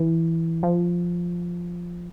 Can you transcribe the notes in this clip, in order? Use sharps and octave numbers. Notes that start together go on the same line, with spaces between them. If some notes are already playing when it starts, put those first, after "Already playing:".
Already playing: E3
F3